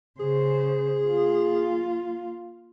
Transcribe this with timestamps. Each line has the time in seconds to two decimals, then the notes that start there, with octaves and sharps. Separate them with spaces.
0.20 C#3 G#4 C5
1.07 A#3 F4